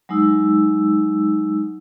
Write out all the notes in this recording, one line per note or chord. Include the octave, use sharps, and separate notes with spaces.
F#3 G#3 D#4 E6